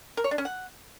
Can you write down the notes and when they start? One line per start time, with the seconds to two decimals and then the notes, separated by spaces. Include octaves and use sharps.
0.17 A#4
0.24 C#5
0.31 D4
0.38 C#4
0.45 F#5